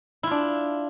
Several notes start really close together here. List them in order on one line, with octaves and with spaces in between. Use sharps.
E4 F4 D4